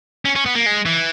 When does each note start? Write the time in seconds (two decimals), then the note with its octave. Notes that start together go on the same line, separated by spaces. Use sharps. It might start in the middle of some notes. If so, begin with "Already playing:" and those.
0.25 C#4
0.36 C#4
0.46 B3
0.55 A#3
0.66 G#3
0.86 E3